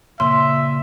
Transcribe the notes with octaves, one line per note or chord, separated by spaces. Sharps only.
A#2 C#3 E5 C6